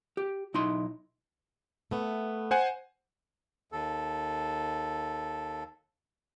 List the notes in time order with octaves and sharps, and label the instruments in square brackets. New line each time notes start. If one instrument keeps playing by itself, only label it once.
[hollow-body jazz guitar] G4
B1 D#4 E4 D#5 C6
[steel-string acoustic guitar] A3 B3
[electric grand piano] C5 F#5 G#5
[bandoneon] D#2 A4